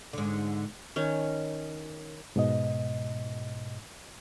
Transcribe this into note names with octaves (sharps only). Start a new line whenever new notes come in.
G#2 D3
D#3 C#4
G#2 B2 D#5